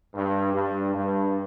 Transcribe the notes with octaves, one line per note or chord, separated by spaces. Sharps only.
G2
G2
G2